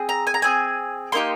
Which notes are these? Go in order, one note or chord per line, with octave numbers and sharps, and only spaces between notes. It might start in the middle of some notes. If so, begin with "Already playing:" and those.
Already playing: C4 G#4
A#5
G#5
A#5
C4 D#4 G#4 G#5
A#3 D#4 G4 C6